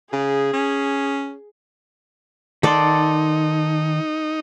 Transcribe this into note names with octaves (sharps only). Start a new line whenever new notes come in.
C#3 G#4
C#4
D#3 D#4 A4 D5 F#5 C6